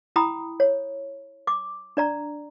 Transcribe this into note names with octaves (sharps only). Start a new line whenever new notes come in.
E4 G5 A#5 B5 D#6
C#5
D6
D4 D5 A#5